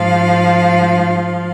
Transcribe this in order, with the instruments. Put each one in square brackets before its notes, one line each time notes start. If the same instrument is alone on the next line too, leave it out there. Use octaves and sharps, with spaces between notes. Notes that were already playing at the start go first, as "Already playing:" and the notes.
Already playing: [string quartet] G#2 F3 F5